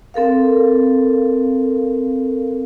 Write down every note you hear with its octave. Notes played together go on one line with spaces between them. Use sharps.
C4 A4 A#4 F5